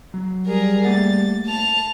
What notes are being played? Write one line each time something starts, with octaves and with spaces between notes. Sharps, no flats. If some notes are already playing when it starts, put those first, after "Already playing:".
F#3
G3 G#4 A#4
A3 A#3 F#5 A6
A5 F7